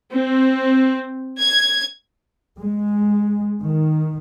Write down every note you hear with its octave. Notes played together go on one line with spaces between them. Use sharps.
C4
G#6
G#3
D#3